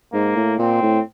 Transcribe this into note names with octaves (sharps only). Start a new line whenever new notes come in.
G#2 A#3
A2
A#2 C4
A2